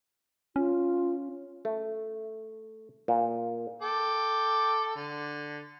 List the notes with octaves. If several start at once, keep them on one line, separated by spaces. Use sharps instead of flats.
C#4 F4
A3
A#2
A4 G5 D6
D3